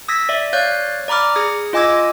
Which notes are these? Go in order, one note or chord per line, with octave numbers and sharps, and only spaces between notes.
D#6 E6 G#6 A#6 B6
D5 E5
C#5 D5 F5 F#6 G6
D5 A#5 B5 D6 F6
G#4 D#6 G#6
F4 D#5 G#5 D6 E6 G#6